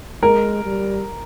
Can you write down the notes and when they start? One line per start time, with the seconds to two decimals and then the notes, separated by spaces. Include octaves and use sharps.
0.23 G#3 A#4
0.65 G3